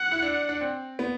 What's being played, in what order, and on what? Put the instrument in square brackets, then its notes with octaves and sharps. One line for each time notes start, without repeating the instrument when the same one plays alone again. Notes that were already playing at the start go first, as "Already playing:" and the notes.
Already playing: [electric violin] F#5
[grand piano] E4
D4
D4
C4
B3